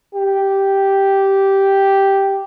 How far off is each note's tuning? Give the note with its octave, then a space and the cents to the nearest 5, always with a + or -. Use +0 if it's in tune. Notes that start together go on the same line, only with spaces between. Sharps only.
G4 -5